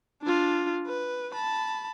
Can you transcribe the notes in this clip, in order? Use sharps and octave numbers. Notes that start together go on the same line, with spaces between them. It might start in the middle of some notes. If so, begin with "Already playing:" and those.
D4 F4
B4
A5 B5